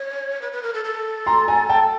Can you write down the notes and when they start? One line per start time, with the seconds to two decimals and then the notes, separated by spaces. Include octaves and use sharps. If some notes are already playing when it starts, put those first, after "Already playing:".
Already playing: C#5
0.42 B4
0.52 B4
0.63 A#4
0.74 A4
0.85 A4
1.26 A#5 C6
1.48 G#5 A#5
1.69 G5 A5